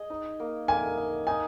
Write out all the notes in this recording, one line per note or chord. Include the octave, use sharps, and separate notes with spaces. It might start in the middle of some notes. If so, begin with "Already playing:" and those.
Already playing: G#4 D#5
D#4
A#3
A#3 G#5
D#4
D#4 G#5